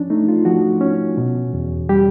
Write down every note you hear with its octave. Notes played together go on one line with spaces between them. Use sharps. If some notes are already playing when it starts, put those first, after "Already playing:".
Already playing: F3 C#4 D4
A3 D#4
F4
F3 F#4
C#4
B2
E2
G3 G4